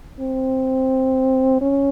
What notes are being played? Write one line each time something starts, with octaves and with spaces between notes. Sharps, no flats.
C4
C#4